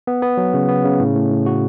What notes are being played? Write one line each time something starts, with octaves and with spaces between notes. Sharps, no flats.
B3
B3
F#3
C#3
B3
C#3
A2
A2
A2
F#4